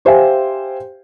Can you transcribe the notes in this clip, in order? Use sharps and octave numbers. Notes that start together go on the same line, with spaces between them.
G4 C5 E5 F5 G5 G#5